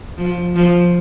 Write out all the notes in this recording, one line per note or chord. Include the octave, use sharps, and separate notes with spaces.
F3
F3